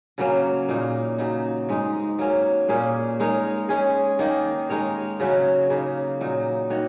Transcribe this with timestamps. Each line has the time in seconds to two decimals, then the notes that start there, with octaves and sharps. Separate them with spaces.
0.18 C#3 F#3 A#3 C#4
0.68 A#2 A#3 D#4
1.18 C#3 F#3 D#4
1.69 G#2 G#3 D#4
2.19 F#3 A#3 C#4
2.68 A#2 A#3 C#4 G#4
3.20 G#3 D#4 A#4 C#5
3.69 G#3 C#4 G#4
4.19 D#3 A#3 D#4 G#4
4.69 G#3 D#4 A#4 C#5
5.20 C#3 F#3 C#4 F#4
5.70 C#3 A#3 D#4
6.21 A#2 F#3 D#4
6.70 D#3 A#3 F#4 C#5